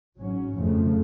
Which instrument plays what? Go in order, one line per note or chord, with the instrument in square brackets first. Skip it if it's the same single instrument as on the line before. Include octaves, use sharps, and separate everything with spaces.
[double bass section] G#1 G#2 F#3 C#4
F#1 F2 C#3 F3 A3